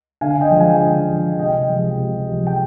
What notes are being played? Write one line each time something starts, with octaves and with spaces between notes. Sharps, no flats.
D3 F5 G#5
D#5 G5
F3 G#3
F5 G#5
D3 D#5 G5
F3 G#3
C3 D#5 G5
F3 G#3
C3
F3 G#3
G5